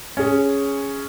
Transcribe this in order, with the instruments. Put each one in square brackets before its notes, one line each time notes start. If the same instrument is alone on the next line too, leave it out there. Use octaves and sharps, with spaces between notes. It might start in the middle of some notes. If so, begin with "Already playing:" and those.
[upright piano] C#4 G#4